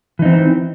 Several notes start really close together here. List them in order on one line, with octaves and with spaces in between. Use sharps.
E3 D#4 C4